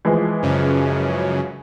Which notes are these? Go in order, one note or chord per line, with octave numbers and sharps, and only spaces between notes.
E3 F3 G#3
F#2 C#3